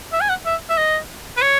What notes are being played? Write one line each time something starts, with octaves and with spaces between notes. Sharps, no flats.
E5
G#5
F#5
E5
E5
D#5
B4
C#5